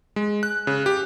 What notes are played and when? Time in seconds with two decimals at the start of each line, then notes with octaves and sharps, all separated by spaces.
0.16 G#3
0.43 F#6
0.67 C#3
0.86 G4